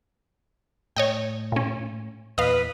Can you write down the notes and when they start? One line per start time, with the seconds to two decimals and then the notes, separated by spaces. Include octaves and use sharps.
0.96 A2 C#5 D#5 G5
1.52 A#2 C#4
2.38 E2 A#2 B4 D#5 F5